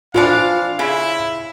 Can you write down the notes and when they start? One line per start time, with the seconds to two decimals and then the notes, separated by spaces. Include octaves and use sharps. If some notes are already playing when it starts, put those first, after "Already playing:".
0.14 E3 F3 D4 F4 F5
0.79 C#3 E4